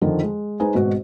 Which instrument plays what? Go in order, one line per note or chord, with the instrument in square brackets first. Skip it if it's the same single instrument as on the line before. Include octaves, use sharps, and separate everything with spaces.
[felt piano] F2 D3 D#3 F3
G#3
G#3 D#4 B4 C5 D#5 G#5
G#1 G#2 B2 F#4